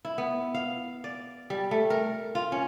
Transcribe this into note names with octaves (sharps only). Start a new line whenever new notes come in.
E4
B3
F5
D5
G3
A3
A#4
F4
C#4